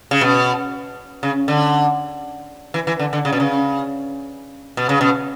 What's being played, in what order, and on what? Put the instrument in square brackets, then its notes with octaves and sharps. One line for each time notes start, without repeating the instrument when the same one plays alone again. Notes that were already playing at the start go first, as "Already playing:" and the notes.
[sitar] C#3
B2
C#3
D3
E3
E3
D3
D3
C#3
B2
C#3
B2
C#3
B2